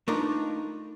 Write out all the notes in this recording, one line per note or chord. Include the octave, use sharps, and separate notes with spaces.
A3 D4 D#4 F4 A#4 B4